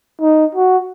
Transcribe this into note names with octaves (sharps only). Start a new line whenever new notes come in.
D#4
F#4